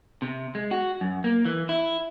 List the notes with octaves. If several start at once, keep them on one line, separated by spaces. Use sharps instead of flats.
C3
G#3
F#4
F#2
A#3
E3
E4